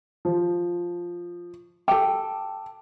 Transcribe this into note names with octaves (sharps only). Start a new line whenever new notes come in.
F3
A4 G5 D6